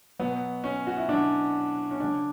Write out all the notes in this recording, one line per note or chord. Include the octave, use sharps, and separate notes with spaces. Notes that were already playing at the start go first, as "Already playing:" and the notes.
B2 F#3 B3
C#4
F#4
E4
B2 F#3 D4
C#4
C#3 F#3 D4